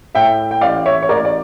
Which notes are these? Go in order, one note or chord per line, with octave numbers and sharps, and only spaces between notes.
A2 E5 G5
G5
A1 D5 F5
C#5 E5
C#5
A1 A#4 D5
D5